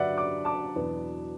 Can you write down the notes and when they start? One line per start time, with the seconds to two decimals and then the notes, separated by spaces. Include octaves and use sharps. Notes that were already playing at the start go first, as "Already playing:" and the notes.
Already playing: D3 F#3 D4 B4 D5 E5 F#5
0.18 D6
0.45 A5 D6
0.76 E2 B2 F#3 B3 D4